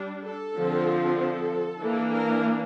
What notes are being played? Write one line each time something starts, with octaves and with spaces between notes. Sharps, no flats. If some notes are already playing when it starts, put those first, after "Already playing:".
Already playing: G3 D4
A4
D3 F3 C4
A4
E3 A#3 D4
A#4